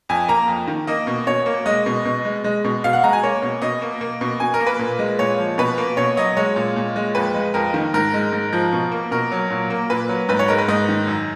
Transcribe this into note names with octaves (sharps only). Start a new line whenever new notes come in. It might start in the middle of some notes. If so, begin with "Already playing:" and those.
F2 G#5
A#3 A#5
F2
D#3
A#3 D#5
B2
B2 C#5
A#3
G#3 D#5
B2
B2
G#3
G#3
B2
B2 F5
F#5
G#3 A#5
G#5
A#3 C#5
B2
B2 D#5
A#3
A#3
B2
B2 G#5
A#4
A#3
B4
A#2
G#3
A#2 C#5
F3
B2 B4
A#3
B2 C#5
F#3 D#5
G#3 C#5
A#2
A#2
G#3
F2 B4
G#3
F2 A#4
D#3
G#2 A#4
G#3
G#2
F3
B2
A#3
B2 A#4
F#3
A#2
A#3
A#2 B4
F#3
G#2 B4
C#5
G#3 A#4
B4
G#2 D#5
D#3
F#2